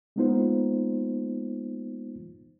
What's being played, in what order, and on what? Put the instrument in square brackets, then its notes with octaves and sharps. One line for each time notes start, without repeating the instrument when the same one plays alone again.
[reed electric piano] G#3 A#3 B3 D#4 F4 C5